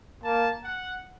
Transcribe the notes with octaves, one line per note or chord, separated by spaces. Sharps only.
A#3 A5
F#5